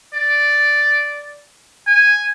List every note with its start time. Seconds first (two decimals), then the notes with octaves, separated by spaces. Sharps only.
0.14 D5
1.87 G#5